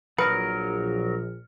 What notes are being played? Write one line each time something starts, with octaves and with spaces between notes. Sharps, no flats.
A#1 F#3 A#4 B4 D#6 F6 C#7